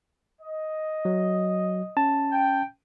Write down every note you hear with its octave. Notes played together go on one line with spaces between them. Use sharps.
D#5
F#3
C#4 A5
G5